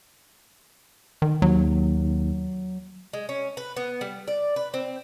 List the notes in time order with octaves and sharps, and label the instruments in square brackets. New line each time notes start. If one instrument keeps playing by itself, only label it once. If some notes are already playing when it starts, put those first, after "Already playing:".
[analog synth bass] D#3
[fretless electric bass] D#2 [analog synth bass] F#3
[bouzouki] G#3
C#4
B4
B3
G3
D5
B4
C4